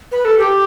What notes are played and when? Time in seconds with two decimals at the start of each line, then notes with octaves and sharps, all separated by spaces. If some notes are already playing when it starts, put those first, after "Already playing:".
0.12 B4
0.25 A4
0.38 G4